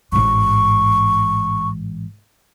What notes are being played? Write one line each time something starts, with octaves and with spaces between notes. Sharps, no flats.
A1 G#2 C#6